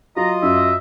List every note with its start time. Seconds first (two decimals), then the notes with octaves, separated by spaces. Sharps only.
0.17 F#3 F4 D#5 A#5
0.43 F#2 E5